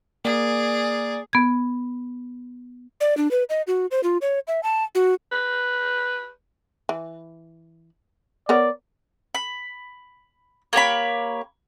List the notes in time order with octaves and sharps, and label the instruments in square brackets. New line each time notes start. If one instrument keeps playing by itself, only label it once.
[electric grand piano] A#3 [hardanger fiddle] G#4 [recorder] D5
[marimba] B3 G#6
[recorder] D5
D4
B4
D#5
F#4
C5
F4
C#5
E5
A5
F#4
[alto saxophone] B4
[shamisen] E3
[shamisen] B3 A#4 C#5 [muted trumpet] D5
[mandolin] B5
A#3 G4 C#5 B5